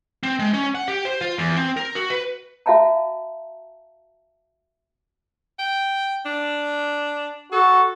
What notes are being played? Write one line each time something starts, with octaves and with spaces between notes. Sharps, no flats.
C4
G#3
C#4
F#5
G4
C5
F4
E2
C4
A#4
F#4
B4
F#4 E5 F5 A5 A#5
G5
D4
F#4 A4